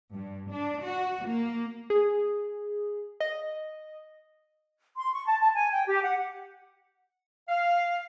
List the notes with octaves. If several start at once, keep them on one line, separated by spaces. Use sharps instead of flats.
G2
D4
F#4
A#3
G#4
D#5
C6
C#6
A5
A5
G#5
G5
G4
F#5
F5